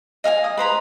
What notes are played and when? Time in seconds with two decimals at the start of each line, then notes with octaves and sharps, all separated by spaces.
0.24 D#5 F5 G5 G#5
0.44 D#6
0.57 B4 C5 A#5 B5